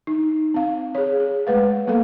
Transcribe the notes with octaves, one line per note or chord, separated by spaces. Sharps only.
D#4
C4 F5
G#4 C#5
G#4
G#3 A3 B4 F5
G3 A#3 B3 A4 F5